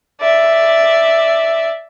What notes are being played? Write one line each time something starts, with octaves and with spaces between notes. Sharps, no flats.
D5 E5